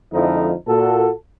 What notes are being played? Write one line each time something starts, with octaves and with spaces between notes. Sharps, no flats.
F2 D3 F3 G#3 D#4 E4
A#2 F#4 A4